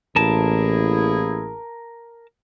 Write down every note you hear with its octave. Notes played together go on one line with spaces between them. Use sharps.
A1 A#3 E4 G#4 A#4 A5